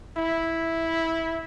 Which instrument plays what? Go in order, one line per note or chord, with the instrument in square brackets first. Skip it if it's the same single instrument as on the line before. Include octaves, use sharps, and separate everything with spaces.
[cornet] E4